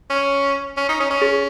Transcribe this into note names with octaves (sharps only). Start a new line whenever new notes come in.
C#4
C#4
D#4
C#4
C#4
G#4